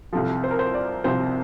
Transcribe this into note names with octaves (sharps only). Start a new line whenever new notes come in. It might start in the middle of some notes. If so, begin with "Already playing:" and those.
C2 C3 F3 A4
C5
A#4
C5
D5
C2 C3 F3 C5